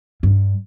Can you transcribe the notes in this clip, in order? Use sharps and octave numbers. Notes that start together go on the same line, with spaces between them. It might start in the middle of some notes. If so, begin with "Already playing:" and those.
G2